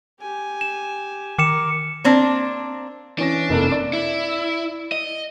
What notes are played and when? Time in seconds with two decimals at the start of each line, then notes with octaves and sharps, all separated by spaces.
0.20 G4 G#5
0.61 E7
1.39 D#3 A#4 D6 C#7 E7
2.04 A#3 C4 D4
3.19 E3 C#4 D4 A#6
3.49 F1 A#3 A4
3.72 D5
3.93 E4
4.92 D#5